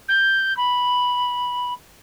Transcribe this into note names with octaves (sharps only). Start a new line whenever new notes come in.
G6
B5